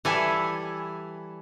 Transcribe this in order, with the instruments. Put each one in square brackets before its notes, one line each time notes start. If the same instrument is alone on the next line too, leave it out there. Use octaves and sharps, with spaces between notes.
[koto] E3 G3 E4 A4 G#5